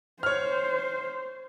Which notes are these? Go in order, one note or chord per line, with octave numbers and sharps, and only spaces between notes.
C5 C#5 F6